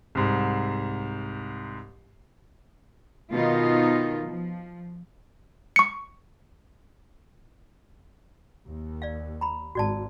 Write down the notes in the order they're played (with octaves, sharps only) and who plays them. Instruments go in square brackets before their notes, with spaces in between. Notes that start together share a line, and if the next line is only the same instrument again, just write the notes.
[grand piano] C2 G#2
[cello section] B2 D#3 B3 D#4 F4
F3
[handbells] C#6 C#7
[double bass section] D#2
[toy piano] D5 F5
A#5 B5
[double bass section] G#1 [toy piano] F#4 D5 A5